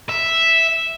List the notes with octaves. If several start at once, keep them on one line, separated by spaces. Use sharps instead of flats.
E5